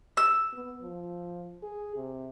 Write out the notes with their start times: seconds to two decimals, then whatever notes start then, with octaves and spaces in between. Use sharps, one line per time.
0.17 E6
0.54 B3
0.82 F3
1.63 G#4
1.96 C3